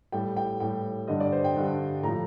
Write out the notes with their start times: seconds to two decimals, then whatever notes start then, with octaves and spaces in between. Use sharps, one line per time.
0.12 A2 G3 G5
0.37 G5
0.60 A2 G3 G5
1.08 G2 D3 G3 D#5
1.20 D5
1.32 C5
1.44 G5
1.56 G2 D3 G3
2.03 A2 F3 A#5